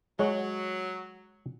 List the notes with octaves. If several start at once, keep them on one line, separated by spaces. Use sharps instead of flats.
F#3 G#3 C#5 F#5